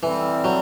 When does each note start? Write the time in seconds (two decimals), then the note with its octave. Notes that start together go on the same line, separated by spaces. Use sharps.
0.03 D3 E3 G3 C4
0.44 F#3